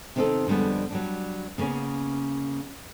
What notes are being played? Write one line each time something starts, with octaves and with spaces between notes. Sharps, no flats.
C3 D#3 C4 C#4 D#4 A4
F2 D3 G3 G#3 B3
F#3 G3 D4
C#3 A#3 B3 C#4